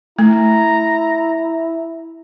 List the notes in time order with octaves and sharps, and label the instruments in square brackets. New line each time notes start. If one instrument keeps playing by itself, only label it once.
[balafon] A3 [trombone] E4 [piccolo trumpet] A#5